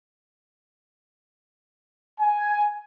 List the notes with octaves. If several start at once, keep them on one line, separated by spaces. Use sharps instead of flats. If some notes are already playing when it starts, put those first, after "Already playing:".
G#5